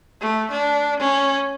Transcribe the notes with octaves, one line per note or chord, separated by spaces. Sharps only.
A3
D4
C#4